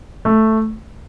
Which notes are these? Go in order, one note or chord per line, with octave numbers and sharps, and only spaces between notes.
A3